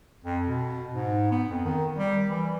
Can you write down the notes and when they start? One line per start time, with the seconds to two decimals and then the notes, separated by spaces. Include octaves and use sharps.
0.24 F2
0.47 B2
0.92 G#2
1.31 B3
1.50 F2
1.65 D#3
1.96 G3
2.30 E3